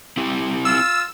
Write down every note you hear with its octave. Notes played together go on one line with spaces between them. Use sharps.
C4 E4 G4
F4 E6